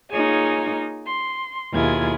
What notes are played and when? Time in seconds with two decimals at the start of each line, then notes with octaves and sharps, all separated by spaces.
0.10 A#3 D#4 F4 G#4 C#5 G#5
1.06 C6
1.72 D#2 B2 E4 F4 G#4 G#6